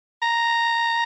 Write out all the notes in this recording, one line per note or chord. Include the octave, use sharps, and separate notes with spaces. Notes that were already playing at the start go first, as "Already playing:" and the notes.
A#5